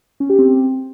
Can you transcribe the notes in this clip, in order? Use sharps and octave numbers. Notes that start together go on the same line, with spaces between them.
C#4
G4
C4